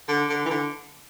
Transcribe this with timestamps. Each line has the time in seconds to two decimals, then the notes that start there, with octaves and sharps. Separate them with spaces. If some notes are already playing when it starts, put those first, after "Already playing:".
0.08 D3
0.29 D3
0.45 E3
0.50 D3